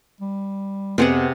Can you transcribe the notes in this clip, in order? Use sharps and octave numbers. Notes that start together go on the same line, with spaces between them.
G3
F2 C3 B3 C4 G#4 F#5